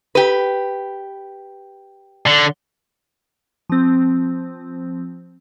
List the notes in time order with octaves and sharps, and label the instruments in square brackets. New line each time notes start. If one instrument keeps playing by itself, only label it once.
[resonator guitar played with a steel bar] G4 B4
[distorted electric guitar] D3
[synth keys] F3 C4